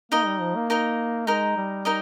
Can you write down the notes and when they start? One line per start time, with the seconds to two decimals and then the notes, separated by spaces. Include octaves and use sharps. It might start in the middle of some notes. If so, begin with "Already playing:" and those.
0.12 A#3 D#4 A#4 D#5
0.26 G3
0.41 F3
0.56 A#3
0.70 D#4 A#4 D#5
1.27 G#3 D#4 A#4 D#5
1.57 G3
1.85 D#4 A#4 D#5